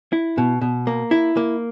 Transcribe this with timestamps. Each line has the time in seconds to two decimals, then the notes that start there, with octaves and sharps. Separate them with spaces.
0.13 E4
0.38 B2
0.62 B2
0.87 A#3
1.11 E4
1.37 A#3